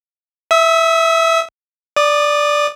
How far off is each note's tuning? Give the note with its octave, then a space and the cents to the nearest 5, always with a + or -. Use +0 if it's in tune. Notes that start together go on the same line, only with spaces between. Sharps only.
E5 +0 D#6 +45
D5 +0 D#6 -30